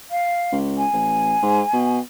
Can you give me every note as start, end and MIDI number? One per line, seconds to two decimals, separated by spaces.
0.11 0.57 77
0.52 0.85 37
0.78 2.00 80
0.93 1.35 33
1.43 1.62 44
1.73 1.99 47